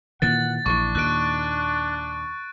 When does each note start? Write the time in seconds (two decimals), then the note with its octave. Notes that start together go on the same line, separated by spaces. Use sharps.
0.22 A#2 D#3 E3 F#5 A6
0.66 A#1 D3 E3 D4 C#6
0.95 D#2 A#2 D#3 F#6 D7